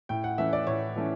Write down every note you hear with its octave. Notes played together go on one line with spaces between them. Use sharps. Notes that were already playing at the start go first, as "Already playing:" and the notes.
A2 G5
F#5
E3 A3 C#4 E5
D5
A2 C#5
E3 A3 C#4